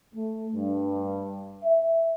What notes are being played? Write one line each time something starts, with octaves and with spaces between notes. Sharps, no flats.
A3
G2
E5